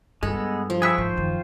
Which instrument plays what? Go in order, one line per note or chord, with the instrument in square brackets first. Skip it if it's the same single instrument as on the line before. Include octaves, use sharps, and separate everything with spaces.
[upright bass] G2 [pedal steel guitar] G#3 B3 [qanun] A4
[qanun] F3
[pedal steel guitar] G#4 B4 E5 [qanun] G5 C#6
[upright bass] G#2 [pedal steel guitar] F4 C5
[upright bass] F#2 D#3